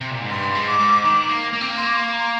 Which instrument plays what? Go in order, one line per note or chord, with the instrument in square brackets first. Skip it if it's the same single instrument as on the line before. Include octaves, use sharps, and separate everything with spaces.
[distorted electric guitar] C3
A#2
G#2
[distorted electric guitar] G2 [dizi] C6
[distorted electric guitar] G#2
[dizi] D6
[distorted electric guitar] G#2
[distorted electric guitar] D#3 [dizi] D6
[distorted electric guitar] A#3
A#3
C4
A#3
[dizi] C6
D6
C6
A#5